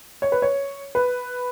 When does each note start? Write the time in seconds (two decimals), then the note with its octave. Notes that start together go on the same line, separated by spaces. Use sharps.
0.22 C#5
0.32 B4
0.42 C#5
0.95 B4